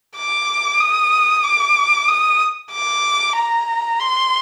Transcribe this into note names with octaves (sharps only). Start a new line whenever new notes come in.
D6
D#6
D6
D#6
D6
A#5
C6